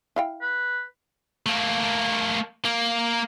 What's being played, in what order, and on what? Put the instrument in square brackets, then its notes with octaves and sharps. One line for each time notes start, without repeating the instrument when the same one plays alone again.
[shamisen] E4 F5 G5
[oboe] B4
[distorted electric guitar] A3 A#3
A#3